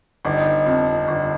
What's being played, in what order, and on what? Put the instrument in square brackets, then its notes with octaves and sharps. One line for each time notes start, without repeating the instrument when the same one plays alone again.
[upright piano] G1 [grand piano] D#4
[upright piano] F2
G1